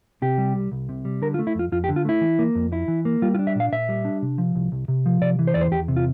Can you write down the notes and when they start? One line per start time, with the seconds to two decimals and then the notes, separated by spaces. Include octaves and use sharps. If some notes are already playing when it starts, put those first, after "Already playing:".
0.22 C3 G4
0.38 G3
0.55 C2
0.72 C2
0.89 C3
1.05 G3
1.22 D3 A#4
1.34 F4
1.39 A3
1.47 E4
1.55 F2 F4
1.72 F2 F4
1.84 G4
1.89 D3
1.96 F4
2.05 A3 E4
2.21 E3
2.39 A#3
2.55 F2
2.72 E4
2.88 E3
3.05 A#3
3.22 G3 F4
3.34 F4
3.39 D4
3.47 E5
3.56 A#2 F5
3.72 A#2 E5
3.89 G3
4.05 D4
4.22 C3
4.38 F3
4.56 C2
4.72 C2
4.88 C3
5.06 F3
5.22 C3 D5
5.39 E3
5.47 C5
5.54 E2 D5
5.61 C5
5.72 E2 G4
5.88 C3
5.96 F4